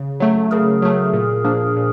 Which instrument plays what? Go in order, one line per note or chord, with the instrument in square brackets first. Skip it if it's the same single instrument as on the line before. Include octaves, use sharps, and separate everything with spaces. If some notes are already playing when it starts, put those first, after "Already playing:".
Already playing: [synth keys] C#3
F#3 A3
[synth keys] C#3 [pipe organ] G#4 A#4
[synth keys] F#3 A3
A#2
F3 A#3 D4
A#2